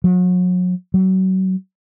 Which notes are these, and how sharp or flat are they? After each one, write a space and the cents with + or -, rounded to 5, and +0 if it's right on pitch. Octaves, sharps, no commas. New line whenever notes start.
F#3 -35
F#3 +30